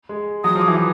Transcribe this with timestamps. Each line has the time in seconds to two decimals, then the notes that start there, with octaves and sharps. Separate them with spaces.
0.09 G#3
0.44 F#3 D#6
0.56 F3
0.61 D6
0.68 E3